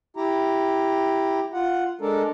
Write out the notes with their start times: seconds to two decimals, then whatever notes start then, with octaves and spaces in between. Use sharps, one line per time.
0.17 E4 G4 A#5
1.53 F4 F#5
2.01 G#3 D4 A4 A#4